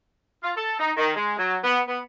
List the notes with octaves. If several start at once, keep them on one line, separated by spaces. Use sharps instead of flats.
F4
A4
D#4
D#3
G#3
F#3
B3
B3